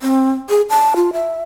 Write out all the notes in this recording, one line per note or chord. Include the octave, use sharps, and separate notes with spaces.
C4
G#4
A5
F4
E5